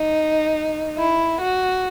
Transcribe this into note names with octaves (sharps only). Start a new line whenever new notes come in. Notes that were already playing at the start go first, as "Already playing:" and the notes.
Already playing: D#4
E4
F#4